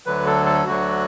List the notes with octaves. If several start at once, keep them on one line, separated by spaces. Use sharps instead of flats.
D2 D3 F#3 B4
A4
A4
D2 D3 F#3 F#4